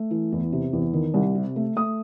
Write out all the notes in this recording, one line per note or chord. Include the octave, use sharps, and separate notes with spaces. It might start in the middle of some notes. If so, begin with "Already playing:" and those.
Already playing: A3
E3
E2
C3
E2
D#3
C2
C3
A3
A3 D#6